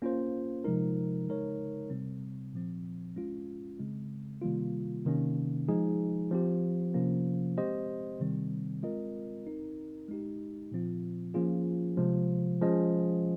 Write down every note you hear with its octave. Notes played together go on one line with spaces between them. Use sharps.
A#3 C#4 F4 C5
C3 F3 G#3 D#4 A#4
C#3 G#3 D#4 A#4 C#5
C3 G3 C4
A#2 F3 C4
G#3 C#4 F4
C#3 G#3 C4
C3 D#3 G3 A#3 F4
C3 D#3 A#3 C#4
F3 G#3 D#4 G#4
F3 C4 G4
C3 F3 A#3 C#4
G#3 C4 G4 C5 D#5
C3 D#3 G3 C4
G#3 C4 F4 A#4 D#5
C4 D#4 A#4
G#3 D#4 G4
A#2 F3 C4 F4
F3 A#3 C#4 F4 G#4
C3 F3 G#3
F3 G#3 C#4 G#4 D#5